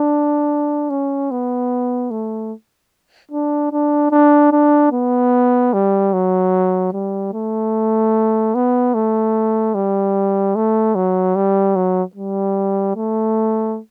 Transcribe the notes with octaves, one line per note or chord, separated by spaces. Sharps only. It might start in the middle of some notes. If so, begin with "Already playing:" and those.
Already playing: D4
C#4
B3
A3
D4
D4
D4
D4
B3
G3
F#3
G3
A3
B3
A3
G3
A3
F#3
G3
F#3
G3
A3